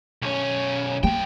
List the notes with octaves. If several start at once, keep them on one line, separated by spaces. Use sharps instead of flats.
B1 C#4
F#2 A#3 G5